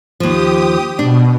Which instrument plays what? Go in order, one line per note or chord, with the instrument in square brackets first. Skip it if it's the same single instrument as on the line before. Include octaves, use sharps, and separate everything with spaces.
[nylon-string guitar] D#2 F3 [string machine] G4 D#6
[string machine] B2 [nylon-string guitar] D4